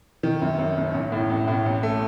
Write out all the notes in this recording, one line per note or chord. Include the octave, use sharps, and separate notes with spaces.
D#3
F#2
F#2
F#1
A1
A2
A1
A2
A1
A3